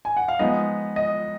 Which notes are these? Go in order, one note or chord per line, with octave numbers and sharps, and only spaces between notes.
G#5
F#5
F5
F3 G#3 B3 D#4 D#5
D#5